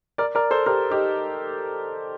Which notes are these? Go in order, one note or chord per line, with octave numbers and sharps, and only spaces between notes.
A#4 D5
A#4 D5
A4 C5
G4 A#4
D#4 G4